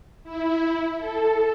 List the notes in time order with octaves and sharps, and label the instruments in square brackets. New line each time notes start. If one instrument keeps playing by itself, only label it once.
[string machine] E4
A4